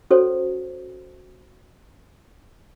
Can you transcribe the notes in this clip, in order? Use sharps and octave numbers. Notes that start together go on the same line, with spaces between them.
C#4 F#4 A4 C5 C#5